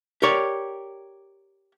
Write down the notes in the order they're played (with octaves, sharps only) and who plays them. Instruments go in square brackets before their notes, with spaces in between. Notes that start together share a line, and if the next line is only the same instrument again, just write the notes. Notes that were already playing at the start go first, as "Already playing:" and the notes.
[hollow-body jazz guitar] G4 A#4 C#5 D5